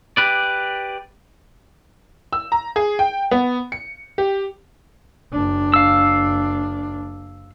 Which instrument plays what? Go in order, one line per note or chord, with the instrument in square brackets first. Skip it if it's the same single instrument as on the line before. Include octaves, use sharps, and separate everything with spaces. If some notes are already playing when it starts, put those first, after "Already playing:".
[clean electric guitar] G4 B4 D5
[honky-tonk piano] E6
A#5
G#4
G5
B3
C#7
G4
[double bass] F#1 D4
[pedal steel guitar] F5 E6